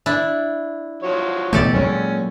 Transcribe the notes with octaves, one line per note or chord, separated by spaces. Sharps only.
D4 E4
F3 F#4 C#5
B2 E3 A3 G4 A4 D5
A#2 F#3 G#3 C#4